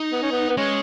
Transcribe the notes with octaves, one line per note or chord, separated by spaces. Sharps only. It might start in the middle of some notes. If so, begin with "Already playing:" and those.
Already playing: D#4
B3
C#4
B3
B3
G#3 C#4